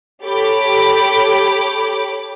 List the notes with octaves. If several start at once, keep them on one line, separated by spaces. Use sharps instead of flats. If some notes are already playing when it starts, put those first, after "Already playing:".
G4 A4 C#5 G5 B5 D6